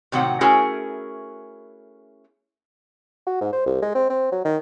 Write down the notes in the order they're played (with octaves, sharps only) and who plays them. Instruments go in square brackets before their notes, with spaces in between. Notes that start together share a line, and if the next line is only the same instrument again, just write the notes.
[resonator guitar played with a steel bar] A2 C3 D#3 F#3 F#5
A3 C#4 E4 F#4 G#4 A#4
[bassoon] F#4
G#2
C5
C2
G#3
C4
C4
F#3
D#3